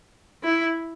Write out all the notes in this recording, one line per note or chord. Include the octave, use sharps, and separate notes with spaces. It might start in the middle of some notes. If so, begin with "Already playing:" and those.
E4